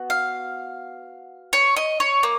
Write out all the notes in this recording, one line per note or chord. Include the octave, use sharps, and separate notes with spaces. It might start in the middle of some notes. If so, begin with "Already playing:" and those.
Already playing: B3 F#4
F5
C#5
D#5
C#5
A#3